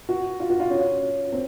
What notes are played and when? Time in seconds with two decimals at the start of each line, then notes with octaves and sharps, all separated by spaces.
0.09 F#4
0.40 F4
0.50 F#4
0.60 F4
0.70 C#4
1.32 C4